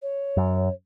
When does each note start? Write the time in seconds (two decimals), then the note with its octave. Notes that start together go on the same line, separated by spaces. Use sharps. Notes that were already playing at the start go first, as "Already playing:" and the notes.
0.02 C#5
0.37 F#2